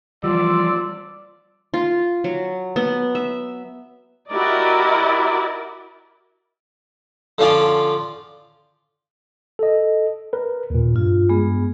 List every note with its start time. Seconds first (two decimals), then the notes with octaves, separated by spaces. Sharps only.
0.23 E3 F3 G3 F4 D5 E6
1.74 F4
2.24 F#3
2.76 B3
3.15 E5
4.30 E4 F#4 G4 A#4 D5 D#5
7.38 D3 F3 C#4 F4 D5
9.59 A4 D#5
10.33 A#4 B4
10.70 D#2 A#2
10.96 G2 F4
11.29 G#3 B3 G#4